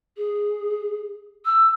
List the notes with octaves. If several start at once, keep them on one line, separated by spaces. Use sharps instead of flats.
G#4
E6